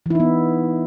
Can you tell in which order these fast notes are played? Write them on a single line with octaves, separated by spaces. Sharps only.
E3 E4 D#4 B3